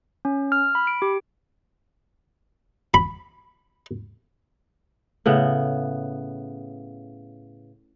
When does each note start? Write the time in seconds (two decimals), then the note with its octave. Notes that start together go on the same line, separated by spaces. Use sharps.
0.25 C#4
0.52 F6
0.75 B5
0.87 D7
1.02 G4
2.94 B5
5.26 A2 C#3 B3